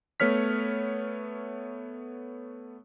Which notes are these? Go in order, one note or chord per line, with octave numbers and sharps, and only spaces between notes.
A3 B3 C#5 F6 B6